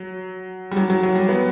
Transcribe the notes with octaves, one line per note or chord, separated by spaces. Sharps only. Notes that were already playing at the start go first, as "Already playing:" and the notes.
Already playing: F#3
G3
F#3
F#3
F#3
G3
B3